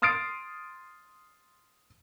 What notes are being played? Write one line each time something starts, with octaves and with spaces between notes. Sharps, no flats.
C6 D#6 F6 A6 C7 D7